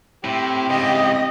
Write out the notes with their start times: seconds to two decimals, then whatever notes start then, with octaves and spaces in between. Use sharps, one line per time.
0.24 A2 C4 E4 G4 C5
0.70 G#2 C#3 D#5